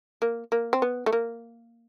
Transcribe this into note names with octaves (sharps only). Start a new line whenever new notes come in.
A#3
A#3
C4
B3
A3
A#3